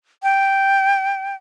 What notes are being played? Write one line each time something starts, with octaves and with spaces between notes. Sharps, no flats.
G5